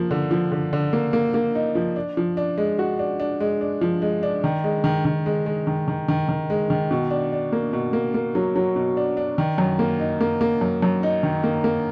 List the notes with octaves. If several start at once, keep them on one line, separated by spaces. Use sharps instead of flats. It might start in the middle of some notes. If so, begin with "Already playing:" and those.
Already playing: F3 A#3
D3
F3
D3
D3
A#3
A#3
A#3
D#4
F3
D4
F3
D4
G#3
F#4
D4
D4
G#3
D4
F3
G#3
D4
D#3
G#3
D#3
D#3
G#3
G#3
D#3
D#3
D#3
D#3
G#3
D#3
B2
D4
D4
A#3
B2
A#3
A#3
F#3
F#3
B2
D4
D4
D#3
F#2
A#3
D#4
A#3
A#3
F#2
F#2
D#4
D#3
A#3
A#3